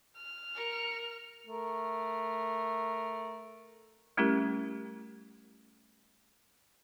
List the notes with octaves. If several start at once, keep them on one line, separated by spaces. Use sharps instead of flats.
F6
A#4 C#7
A3 A#4
G3 A3 C#4 E4 G4 A#4